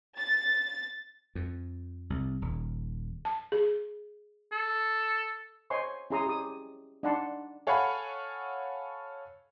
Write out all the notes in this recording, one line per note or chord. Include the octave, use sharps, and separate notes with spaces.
A6
F2
C2
D#1
A5
G#4
A4
C5 C#5 D#5 G#5 C6 C#6
C#4 E4 G#4 A#5 C6 D#6
G4 D#6
D4 D#4 D5 F#5 A5 C6
A4 C#5 F5 F#5 G#5 B5